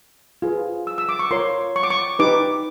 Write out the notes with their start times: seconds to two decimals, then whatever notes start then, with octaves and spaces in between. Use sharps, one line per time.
0.42 F4 G#4 B4
0.87 E6
0.98 E6
1.09 D6
1.19 C#6
1.31 F4 A#4 C#5 C6
1.76 C#6
1.83 D6
1.90 C#6
2.19 D#4 G4 B4 D6